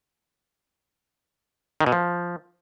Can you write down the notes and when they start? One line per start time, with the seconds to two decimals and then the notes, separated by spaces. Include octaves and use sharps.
1.81 D#3
1.86 B2
1.92 F3